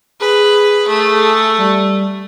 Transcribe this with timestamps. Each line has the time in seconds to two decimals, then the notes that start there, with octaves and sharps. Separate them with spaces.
0.20 G#4 B4
0.88 A3
1.58 G3